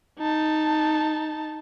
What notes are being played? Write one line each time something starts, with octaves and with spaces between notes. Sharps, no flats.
D#4 A5